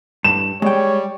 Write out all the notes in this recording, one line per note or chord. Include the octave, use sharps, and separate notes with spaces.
G2 E7
G3 G#3 C#5 G5